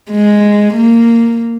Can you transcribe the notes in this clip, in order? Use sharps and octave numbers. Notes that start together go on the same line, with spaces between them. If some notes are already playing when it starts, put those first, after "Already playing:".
G#3
A#3